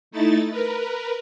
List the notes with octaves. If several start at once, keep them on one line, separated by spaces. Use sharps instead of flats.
A3 D#4 E4 A6
A#4 B4